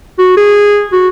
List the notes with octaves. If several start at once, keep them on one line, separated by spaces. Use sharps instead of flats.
F#4
G#4
F#4